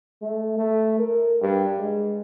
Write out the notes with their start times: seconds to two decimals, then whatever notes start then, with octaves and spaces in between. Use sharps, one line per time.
0.22 A3
0.58 A3
0.99 A#4
1.42 G2
1.79 G#3